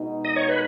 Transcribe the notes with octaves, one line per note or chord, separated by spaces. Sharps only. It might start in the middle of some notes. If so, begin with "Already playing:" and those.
Already playing: B2 G#3 D#4
D#5
C#5
B4